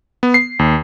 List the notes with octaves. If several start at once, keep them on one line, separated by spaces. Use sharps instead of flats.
B3
C7
D#2